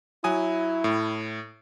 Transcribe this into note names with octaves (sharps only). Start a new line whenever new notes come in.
F#3 E4 G#5 D#6
A2